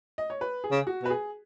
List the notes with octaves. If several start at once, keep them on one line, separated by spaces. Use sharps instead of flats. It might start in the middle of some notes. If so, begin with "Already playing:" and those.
D#5
C#5
B4
G#4
C#3
F#4
B2 B4
G#4